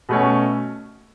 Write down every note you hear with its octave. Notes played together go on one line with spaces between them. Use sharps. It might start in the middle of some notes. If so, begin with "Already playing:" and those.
B2 A3 C#4